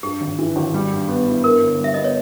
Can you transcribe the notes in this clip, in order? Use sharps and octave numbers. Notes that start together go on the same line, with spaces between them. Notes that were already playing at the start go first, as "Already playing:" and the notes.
G2 G4
G#1
E3
G#1
G3
G2
B3
E4
G2 A#4
G1
G3 E5
B3 D#5
C#5